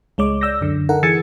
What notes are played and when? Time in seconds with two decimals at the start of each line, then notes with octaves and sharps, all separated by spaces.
0.18 C#2 G#3 C#5 D6
0.41 D5 E6 G6 A#6
0.61 F#2 D3
0.89 D#4 A4 A#4 F#5
1.03 E3 G#4 E6 G#6 A6 C#7